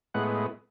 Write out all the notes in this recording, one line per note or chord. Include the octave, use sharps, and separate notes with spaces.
A2 G#3 B3 F#5